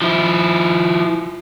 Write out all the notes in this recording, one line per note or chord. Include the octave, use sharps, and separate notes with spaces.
F3 E4